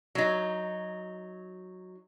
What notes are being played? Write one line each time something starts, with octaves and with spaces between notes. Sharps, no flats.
F#3 D#4